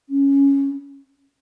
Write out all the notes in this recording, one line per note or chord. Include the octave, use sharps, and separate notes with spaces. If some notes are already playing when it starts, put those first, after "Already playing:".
C#4